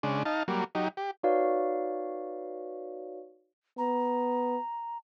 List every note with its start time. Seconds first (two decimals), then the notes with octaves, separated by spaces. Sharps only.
0.03 C#3 G#3 D4
0.25 D#4 F5 A5
0.48 F#3 G3 A#3
0.75 F#3 D#4 G4
0.97 G4
1.23 D#4 F#4 B4 C#5 D5 F5
3.78 B3 A#5